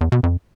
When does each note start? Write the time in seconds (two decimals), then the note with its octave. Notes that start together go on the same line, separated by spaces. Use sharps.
0.01 E2
0.12 B2
0.23 F2